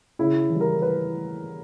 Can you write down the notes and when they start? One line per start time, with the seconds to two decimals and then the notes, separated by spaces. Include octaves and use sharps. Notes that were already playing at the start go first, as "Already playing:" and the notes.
0.19 C#3 E4
0.50 E3
0.55 G3
0.61 A#4
0.82 B4